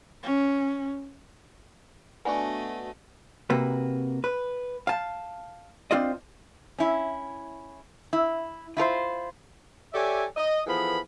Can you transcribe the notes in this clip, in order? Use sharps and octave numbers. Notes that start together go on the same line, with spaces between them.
C#4
A3 B3 D4 F#4 D#5 F#5 G#5
C3 A#3 F#4 B4
B4
F5 A5
C4 D4 F4 C5 D5 D#5
C#4 E4
E4
E4 F4 A#4 C5
G4 A4 C#5 D5 E5 G#5
D#5
E3 F3 B3 G#4 A4 B5